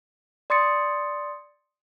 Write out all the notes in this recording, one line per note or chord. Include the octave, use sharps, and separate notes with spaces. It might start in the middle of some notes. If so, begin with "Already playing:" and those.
D5 C6 D#6 A6 C#7